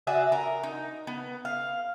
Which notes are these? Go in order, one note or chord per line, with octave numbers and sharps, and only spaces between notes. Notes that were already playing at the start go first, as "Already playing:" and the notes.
F#4 G#4 D5 E5
A#4
D#4
B3
F5